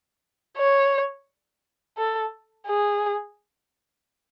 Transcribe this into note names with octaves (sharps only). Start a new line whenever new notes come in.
C#5
A4
G#4